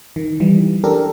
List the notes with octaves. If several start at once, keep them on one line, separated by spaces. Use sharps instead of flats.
D#3
E3 G3
D4 G4 A4 A#4